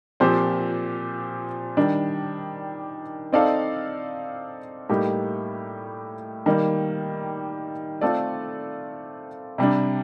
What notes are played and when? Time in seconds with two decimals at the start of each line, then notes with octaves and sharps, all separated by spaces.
0.20 A#2 F3 C4 G4 C5
1.77 D#3 G3 D4
3.33 C4 D#4 A4 D5 F5
4.89 A2 G3 A#3 D#4 G4
6.46 D#3 G3 A#3
8.01 A3 C4 F4 A4 D5
9.58 C3 G3 D4